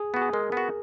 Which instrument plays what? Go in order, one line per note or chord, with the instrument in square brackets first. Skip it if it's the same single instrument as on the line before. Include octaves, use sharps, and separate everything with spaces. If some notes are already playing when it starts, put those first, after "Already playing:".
Already playing: [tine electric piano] G#4
[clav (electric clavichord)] B3 F#4
[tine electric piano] G#4
[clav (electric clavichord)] G#3 [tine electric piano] A#4
[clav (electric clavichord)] B3 F#4